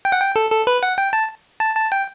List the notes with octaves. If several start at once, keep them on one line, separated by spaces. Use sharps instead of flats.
G5
F#5
G5
A4
A4
B4
F#5
G5
A5
A5
A5
G5